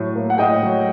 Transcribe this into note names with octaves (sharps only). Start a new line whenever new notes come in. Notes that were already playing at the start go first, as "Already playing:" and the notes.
Already playing: A2 F#3
A#3
F#5
A2 D#5 G5
F#3